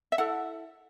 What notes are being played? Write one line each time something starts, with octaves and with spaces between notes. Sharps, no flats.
E5
E4 A4 F#5